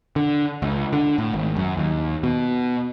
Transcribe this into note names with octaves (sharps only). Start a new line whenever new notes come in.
D3
C#2
D3
A2
G#1
F#2
D#2
B2